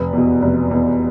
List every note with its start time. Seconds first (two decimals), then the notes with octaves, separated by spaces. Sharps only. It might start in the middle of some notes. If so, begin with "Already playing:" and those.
Already playing: F1 B4
0.13 E2 B2
0.42 F1
0.71 E2 B2